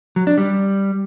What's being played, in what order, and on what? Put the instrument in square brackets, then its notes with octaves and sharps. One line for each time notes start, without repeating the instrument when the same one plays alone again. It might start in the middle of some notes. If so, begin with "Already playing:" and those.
[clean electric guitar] F#3
D4
G3